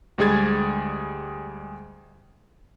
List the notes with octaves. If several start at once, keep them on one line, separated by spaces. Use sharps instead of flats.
D2 G3 G#3 G#4 G#6 A6